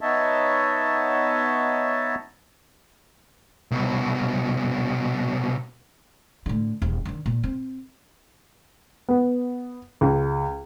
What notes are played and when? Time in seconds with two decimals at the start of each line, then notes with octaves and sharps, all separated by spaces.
0.01 B3 D#4 C#5 D#5 E5 A5
3.71 C2 B2
6.46 A2 D3
6.82 D#1 E2
7.05 D3 D#3
7.26 A#2
7.43 C4
9.09 B3
10.01 C#2